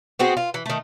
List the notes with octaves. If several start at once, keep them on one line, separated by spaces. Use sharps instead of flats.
B3 C4 F#4 G#4
F4
E3
D#3 A3